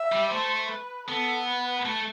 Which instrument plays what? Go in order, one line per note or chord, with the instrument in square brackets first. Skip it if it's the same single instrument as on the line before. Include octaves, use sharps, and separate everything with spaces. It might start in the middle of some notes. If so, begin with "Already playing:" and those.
Already playing: [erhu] E5
[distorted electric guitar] G3
[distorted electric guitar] A3 [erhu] C5
[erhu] B4
[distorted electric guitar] B3 [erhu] A4
[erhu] B4
[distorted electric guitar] A3